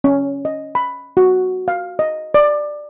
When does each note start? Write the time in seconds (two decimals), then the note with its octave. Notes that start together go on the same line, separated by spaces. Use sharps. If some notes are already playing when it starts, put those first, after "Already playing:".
0.04 C#4
0.45 D#5
0.75 B5
1.17 F#4
1.68 F5
1.99 D#5
2.34 D5